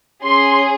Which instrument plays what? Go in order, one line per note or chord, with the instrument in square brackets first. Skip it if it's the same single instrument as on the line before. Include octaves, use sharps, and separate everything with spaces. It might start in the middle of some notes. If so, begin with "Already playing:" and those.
[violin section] C#4 G#4 C6